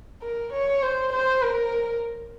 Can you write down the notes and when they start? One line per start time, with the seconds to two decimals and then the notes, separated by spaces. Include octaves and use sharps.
0.22 A#4
0.53 C#5
0.82 C5
1.13 C5
1.42 A#4